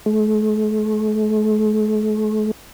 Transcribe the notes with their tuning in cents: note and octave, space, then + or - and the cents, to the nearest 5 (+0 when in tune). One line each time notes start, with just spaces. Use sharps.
A3 -45